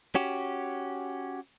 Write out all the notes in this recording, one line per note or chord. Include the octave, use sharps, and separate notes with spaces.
C#4 F#4 G4